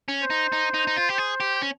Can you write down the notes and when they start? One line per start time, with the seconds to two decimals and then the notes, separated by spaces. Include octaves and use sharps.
0.08 C#4
0.23 C5
0.30 D#4
0.52 D#4
0.74 D#4
0.87 D#4
0.97 F4
1.09 G4
1.18 G#4
1.40 G4
1.62 C#4